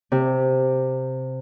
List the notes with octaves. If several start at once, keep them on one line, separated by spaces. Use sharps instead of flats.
C3